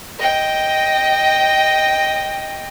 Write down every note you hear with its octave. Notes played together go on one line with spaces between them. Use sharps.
D#5 G5